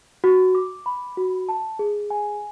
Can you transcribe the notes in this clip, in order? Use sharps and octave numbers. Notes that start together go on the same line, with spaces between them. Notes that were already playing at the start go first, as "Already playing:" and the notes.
F#4
D6
B5
F#4
A5
G#4
G#5